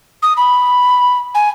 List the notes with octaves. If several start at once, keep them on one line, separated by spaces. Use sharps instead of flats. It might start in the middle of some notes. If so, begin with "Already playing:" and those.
D#6
B5
G#5